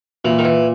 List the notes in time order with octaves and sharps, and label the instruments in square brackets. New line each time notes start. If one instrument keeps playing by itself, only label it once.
[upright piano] A#2 [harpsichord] E3
[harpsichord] D#3
E3